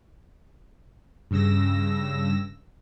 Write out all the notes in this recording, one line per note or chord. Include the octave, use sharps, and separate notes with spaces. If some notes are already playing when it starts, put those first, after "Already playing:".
G2 C#3 E6 A#6